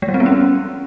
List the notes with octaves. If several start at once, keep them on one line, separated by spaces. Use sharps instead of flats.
G#3
G3
C4
B3
C#4